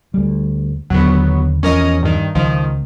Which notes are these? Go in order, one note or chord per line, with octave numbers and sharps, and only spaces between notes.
D2 G3
D#2 D3 F#3 B3
E2 F3 C#4 A#4 D#5
G2 D#3
C#2 D#3 F3